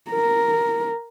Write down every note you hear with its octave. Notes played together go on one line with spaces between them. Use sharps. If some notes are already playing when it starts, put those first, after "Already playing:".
A#4